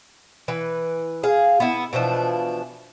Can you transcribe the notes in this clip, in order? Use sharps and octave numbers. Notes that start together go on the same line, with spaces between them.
E3 B4
G#4 F5
B3 E4
B2 E3 F3 D4